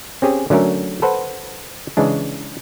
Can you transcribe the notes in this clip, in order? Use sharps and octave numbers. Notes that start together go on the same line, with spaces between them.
C4 C#4 G4 G#4
D3 F#3 A3 C#4 A#4
A4 B4 C5 F#5
C#3 E3 G#3 D4